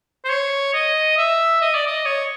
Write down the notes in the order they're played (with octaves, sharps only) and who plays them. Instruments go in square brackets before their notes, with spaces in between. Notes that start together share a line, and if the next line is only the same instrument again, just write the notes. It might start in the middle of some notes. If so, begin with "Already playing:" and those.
[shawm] C5
C#5
D#5
E5
D#5
D5
D#5
C#5